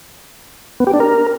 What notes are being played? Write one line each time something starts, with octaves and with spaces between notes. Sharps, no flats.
B3
G4
D4
A#4